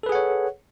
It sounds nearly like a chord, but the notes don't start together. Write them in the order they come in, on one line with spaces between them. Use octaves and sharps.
A4 B4 G#4 F#5 C#5